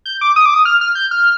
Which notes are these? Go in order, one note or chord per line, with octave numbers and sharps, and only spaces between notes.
G6
D6
D#6
D6
D#6
F6
F6
G6
F6